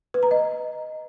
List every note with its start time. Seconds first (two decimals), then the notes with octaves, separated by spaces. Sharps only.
0.14 B4
0.23 A#5
0.31 D#5